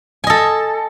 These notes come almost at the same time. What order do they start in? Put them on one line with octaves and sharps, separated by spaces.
G#5 D#5 A4